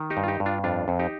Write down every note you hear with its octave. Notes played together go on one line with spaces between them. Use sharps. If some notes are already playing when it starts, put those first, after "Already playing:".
Already playing: D#3
D#4 G4
G2
F4
D#4 G4
G2
D4 F4
F2 D4 F4
F2
D#4 G4